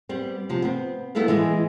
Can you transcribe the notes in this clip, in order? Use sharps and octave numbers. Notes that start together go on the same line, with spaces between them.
G3 B3 C4
C3 F3
B3 C4
G3 B3 E4 A4 B4 F5
E3 G#3 B3